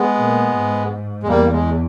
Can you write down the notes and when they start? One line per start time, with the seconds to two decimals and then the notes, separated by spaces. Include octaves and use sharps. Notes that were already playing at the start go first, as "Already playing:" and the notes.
Already playing: G#3 B3
0.17 A#2
0.54 G#2
1.23 G#3
1.28 E2 G3 A#3
1.53 G#3